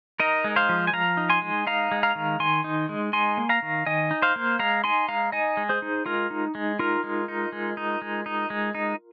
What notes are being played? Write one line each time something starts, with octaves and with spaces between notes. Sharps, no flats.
D#4 A#4 D#5
G#3
C5 F5
F3
G#5
F3 F5 A#5
D#4
G#5 C6
G#3
D#4 F5 A#5
G#3
F5 A#5
D#3
D#3 G#5 C6
D#4
G#3
D#4 G#5 C6
A#3
F5 A#5
D#3
D#3 D#5 G#5
D#4
C5 F5
A#3
G#3 F5 A#5
D#4 G#5 C6
G#3 F5 A#5
D#4 D#5 G#5
G#3
G#4 C5
D#4
G#3 F4 A#4
D#4
G#3
D#4 F4 A#4
G#3
D#4
G#3
D#4
G#3
D#4
G#3
D#4